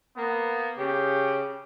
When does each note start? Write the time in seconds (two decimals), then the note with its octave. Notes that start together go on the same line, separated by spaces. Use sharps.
0.17 A#3 B3
0.78 C#3 G4